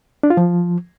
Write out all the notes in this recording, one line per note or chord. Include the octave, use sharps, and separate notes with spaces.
D4
F4
F3